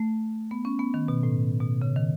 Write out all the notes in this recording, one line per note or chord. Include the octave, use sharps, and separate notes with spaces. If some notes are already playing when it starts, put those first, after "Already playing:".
Already playing: A3
B3
C#4
B3
D#3
B2
A2
B2
C#3
D#3